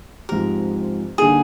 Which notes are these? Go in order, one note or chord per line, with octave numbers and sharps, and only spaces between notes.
G#2 F3 G#3 C4 G4 A#4
D3 G3 A#3 D#4 G#4